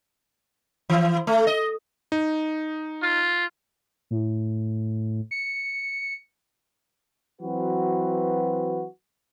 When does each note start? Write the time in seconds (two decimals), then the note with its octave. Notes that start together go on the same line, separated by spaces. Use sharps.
0.90 E3
1.27 A3
1.47 D#5
2.12 D#4
3.03 F4
4.11 A2
5.31 C#7
7.41 E3 F#3 C4 F#4 B4